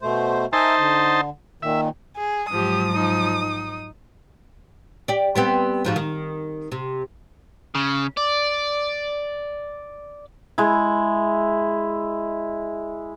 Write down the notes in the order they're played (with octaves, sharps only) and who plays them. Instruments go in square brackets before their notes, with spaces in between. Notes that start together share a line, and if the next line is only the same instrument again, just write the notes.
[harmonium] B2 A3 C5
[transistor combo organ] D#4 C5 A5 [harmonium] A#4 E5 G#5
[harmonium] D3
[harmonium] A#2 D#3 [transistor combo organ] E5
[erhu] G#4
[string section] G#2 F#3 [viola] F3 G4 [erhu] D#6
[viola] F3 D#4
D#4
[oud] G4 D5
G3 B3 C4
G#2 F3 F#4
D#3
C3
[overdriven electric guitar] C#3
D5
[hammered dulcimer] G#3 E4